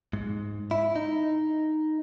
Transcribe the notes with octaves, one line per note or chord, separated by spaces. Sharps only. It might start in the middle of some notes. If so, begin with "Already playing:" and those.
G#2
E4
D#4